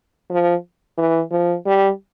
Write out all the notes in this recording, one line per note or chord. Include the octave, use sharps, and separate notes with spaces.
F3
E3
F3
G3